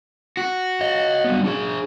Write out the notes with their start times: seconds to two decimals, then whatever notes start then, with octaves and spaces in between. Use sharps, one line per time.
0.37 F#4
0.81 C#5 D#5
1.24 G3 B3
1.44 D4 G#4